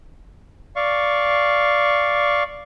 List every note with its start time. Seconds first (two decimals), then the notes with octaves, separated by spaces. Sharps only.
0.76 D5 F5 C#6